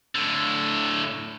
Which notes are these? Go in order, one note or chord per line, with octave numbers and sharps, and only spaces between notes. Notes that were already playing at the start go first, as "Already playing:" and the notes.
A2 D3